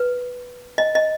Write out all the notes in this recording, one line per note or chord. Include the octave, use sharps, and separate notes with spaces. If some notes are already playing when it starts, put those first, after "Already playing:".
Already playing: B4
D#5
D#5